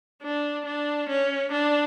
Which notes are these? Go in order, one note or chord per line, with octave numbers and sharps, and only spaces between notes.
D4
D4
C#4
D4